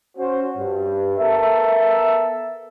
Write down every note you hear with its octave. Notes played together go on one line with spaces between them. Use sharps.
C#4 F#4 C5
G2
B3 A4 A#4 E5